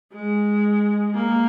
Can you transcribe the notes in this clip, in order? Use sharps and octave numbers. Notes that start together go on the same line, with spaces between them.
G#3
A#3